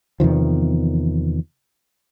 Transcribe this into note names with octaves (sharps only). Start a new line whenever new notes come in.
E2 C3 D#3 F3